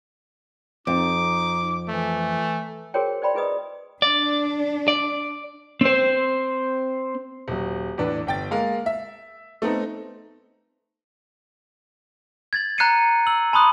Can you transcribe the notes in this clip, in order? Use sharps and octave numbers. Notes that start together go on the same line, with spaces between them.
F2 D#4 D6
E3 A3
F#4 G#4 A#4 C5 C#5 G5
C5 D5 G5 B5 C6
E4 G#4 B4 D#5 D#6
D4 D5
D5
C4 C5
D#1 F#3
E2 A2 D4 B4
G1 G5 A6
G#3 A#3 F5
E5
A3 B3 C4 D#4
G#6 A6 F#7
A#5 F#6 G#6 C7 C#7 D#7
E6 F#7
A5 B5 C6 D#6 F#6